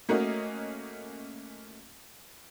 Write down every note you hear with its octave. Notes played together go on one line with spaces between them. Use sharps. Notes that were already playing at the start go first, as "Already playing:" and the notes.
A3 A#3 C#4 F#4 A#4 D#5